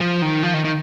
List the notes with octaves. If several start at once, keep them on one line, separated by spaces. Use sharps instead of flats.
F3
D#3
F3
D#3
D#3